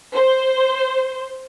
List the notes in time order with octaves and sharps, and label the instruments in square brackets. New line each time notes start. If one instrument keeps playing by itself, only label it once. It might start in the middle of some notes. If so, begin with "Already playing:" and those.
[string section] C5